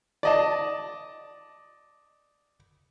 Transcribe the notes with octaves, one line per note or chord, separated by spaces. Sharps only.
D5 D#5 A5